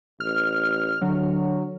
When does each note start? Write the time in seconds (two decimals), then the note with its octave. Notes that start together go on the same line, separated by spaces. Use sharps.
0.20 A1 F6
1.02 D3 F#3